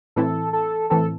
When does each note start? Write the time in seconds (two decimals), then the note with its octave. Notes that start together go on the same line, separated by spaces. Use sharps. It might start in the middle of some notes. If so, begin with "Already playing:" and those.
0.16 A2 E3 C4 E4 A4
0.53 A4
0.90 A2 E3 C4 A4